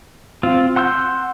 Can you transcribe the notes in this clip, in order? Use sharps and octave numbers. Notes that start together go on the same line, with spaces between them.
C4 F4
F#5 C6 E6 G6